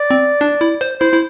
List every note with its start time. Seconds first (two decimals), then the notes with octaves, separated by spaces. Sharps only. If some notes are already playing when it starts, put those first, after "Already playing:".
Already playing: D5
0.11 C4
0.41 D4
0.61 E4
0.81 C5
1.00 E4 C5
1.13 E4